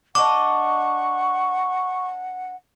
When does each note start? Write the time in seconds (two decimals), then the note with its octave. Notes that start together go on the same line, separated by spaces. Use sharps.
0.15 D4 D#5 F#5 C#6 D6